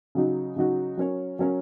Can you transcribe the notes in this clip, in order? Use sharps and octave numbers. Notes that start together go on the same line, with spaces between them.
C#3 F#3 D#4 F#4
C#3 F#3 D#4 F#4
F#3 C#4 A#4 C#5
F#3 C#4 A#4 C#5